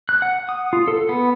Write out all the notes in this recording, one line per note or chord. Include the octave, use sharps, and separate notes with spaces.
F#6
F#5
D#6
F4
A4
B3